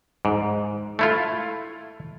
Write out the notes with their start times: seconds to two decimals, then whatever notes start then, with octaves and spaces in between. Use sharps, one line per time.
0.25 G#2
0.99 A3 E4 F4